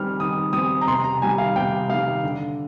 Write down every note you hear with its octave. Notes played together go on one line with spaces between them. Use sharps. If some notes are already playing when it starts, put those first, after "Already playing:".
Already playing: D#3 G3 C4 F6
D#3 D#6
G3 C4 D#6
A#5
C3 C6
A#5
D#3 G3 G#5
F5
C3 G5
D#3 G3 F5
D3